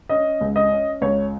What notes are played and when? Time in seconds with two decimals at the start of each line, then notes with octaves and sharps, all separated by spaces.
0.09 C#4 D#5
0.41 C#2
0.56 D#5
0.71 C#4
1.02 C#2 C#5